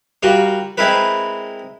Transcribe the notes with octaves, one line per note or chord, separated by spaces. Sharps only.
G3 F4 F#4 A#4
G#3 C4 E4 A#4 B4